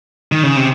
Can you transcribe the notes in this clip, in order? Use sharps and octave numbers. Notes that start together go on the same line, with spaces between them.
D#3
C#3
C3